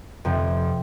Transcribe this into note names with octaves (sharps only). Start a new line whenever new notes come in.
F2 C3 F3